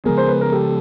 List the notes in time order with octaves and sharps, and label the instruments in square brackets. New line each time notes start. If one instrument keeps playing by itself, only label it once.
[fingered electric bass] C#3 F3 G#3 B3 [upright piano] G#4 A#4
[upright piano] C5
B4
A#4
G4 A4